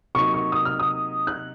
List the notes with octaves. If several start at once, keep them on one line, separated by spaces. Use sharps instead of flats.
C3 F#3 A#3 D#4 C#6
C#6
D#6
F6
D#6
F#6